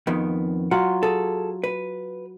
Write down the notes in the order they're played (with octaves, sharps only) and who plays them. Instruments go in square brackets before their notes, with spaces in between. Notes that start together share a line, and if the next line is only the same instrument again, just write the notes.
[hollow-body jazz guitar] F2 D#3 B3
[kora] F#3 F4 [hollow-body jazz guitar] F#5
[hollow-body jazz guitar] G#4 A4
B4